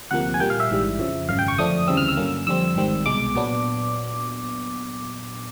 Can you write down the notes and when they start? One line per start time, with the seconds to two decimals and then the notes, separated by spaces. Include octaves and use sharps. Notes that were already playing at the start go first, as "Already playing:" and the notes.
0.11 D2 C3 F3 A#3 F#5
0.34 G#5
0.40 A#2 G3 A#3 G5
0.50 F5
0.60 E5
0.69 A1 G#2 E3 G3
0.99 F2 C#3 F3
1.29 G#1 F#2 C#3 F5
1.39 G5
1.48 C#6
1.58 F2 D3 F3 A3 D4 D#6
1.87 D2 C#3 E3 G3 C4 E6
1.97 F6
2.08 E6
2.17 G2 D3 F#3 A#3 C#4
2.47 F2 D3 G3 C4 E6
2.76 G#1 G#2 D#3 G3 C4
3.06 C2 B2 G#3 D6
3.35 A#2 F#3 B3 D4